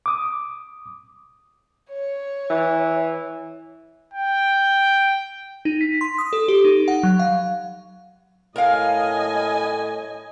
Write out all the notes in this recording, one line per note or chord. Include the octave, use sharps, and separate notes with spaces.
D6 D#6
C#5
E3
G5
D#4
B6
C6
D#6
A4
G4
D#4
F#5
F#3
F5
A2 A#4 D#5 F5 G#5